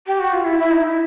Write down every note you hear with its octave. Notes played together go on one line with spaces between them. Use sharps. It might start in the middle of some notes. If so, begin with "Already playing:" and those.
G4
F#4
F4
E4
E4
D#4
E4